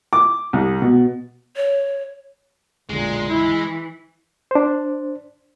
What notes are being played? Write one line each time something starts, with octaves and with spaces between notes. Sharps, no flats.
D6
C2
B2
C#5
F#1 B1 A#2 D3 G#3
E3 E4
D4 C5